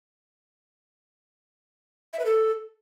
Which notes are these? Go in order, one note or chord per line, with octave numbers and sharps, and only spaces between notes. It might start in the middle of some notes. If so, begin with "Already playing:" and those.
E5
B4
A4